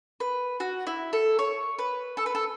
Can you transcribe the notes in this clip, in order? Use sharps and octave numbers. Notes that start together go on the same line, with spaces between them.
B4
F#4
E4
A4
C#5
B4
A4
B4
A4